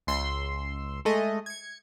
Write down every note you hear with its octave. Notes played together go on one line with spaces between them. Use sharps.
C#2 C6 E6
G#3 A3 D#5
G#6 C#7